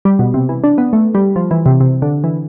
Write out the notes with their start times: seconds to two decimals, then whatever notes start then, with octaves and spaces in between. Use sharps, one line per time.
0.05 G3
0.19 B2
0.34 C3
0.49 E3
0.64 D4
0.78 B3
0.93 A3
1.15 G3
1.36 F3
1.51 E3
1.66 C3
1.80 C3
2.02 D3
2.24 E3